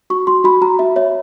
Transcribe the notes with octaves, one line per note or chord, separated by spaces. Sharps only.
F#4 C#6
F#4 C6
F#4 B5
F#4 A#5
F#4 E5
C#5 E5